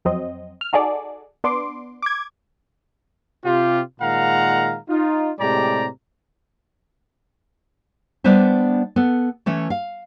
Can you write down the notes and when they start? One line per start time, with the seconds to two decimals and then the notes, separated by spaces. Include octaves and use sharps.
0.05 F2 F#3 C4 D#5
0.61 F6
0.73 D#4 F#4 G#4 A4 D5
1.44 B3 D4 C6 D6
2.02 D6 G#6
3.44 C3 F4 G4
4.01 A#2 D#3 G#3 F5 F#5 A#5
4.88 D#4 F4
5.39 A2 C3 G#3 G4 D5 A#5
8.24 G3 B3 D4 B4 C5 E5
8.96 B3 A4
9.46 E3 A3 C#4
9.70 F5